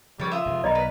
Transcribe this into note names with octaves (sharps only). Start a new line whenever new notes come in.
C#3 F3 G3 C#5 D5
F4 E5 D#6
F1 G#2 C3
B1 A#4 D5 D#5 B5
B4